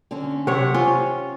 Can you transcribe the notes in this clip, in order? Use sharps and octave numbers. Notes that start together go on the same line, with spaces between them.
D3 C4 C#4
C3 F#3 C5 C#5 F#5
C#4 F4 G4 C#5